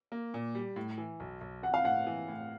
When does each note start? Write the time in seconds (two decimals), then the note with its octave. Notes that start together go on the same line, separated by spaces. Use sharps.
0.12 A#3
0.34 A#2
0.55 G3
0.76 A2
0.98 E3
1.20 B1
1.41 B1
1.63 E3 F#5
1.74 F5
1.84 A2 F#5
2.07 E3
2.28 A2